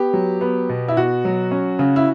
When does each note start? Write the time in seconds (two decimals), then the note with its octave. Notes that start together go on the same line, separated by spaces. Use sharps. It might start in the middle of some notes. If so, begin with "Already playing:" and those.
Already playing: B3 G4
0.13 F#3
0.41 B3
0.69 B2
0.88 E4
0.97 B2 F#4
1.25 F#3
1.51 C#4
1.79 C#3
1.96 E4